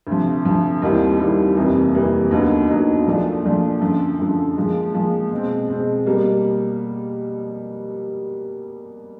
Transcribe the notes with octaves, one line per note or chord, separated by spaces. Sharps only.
D2 C3 F3
D2 C3 F3
D#2 D#3 G3 C4 E4
D#2 D#3 G3 C4 E4
F2 C3 E3 G3 A#3
F2 C3 E3 G3 A#3
D#2 D3 F#3 B3 D#4
D#2 D3 F#3 B3 D#4
A#2 F3 A3 D4 F4
A#2 F3 A3 D4 F4
F#2 D3 F3
F#2 D3 F3
A#2 F3 G#3
A#2 F3 G#3
B2 G#3 C4
B2 G#3 C4
B2 G3 A#3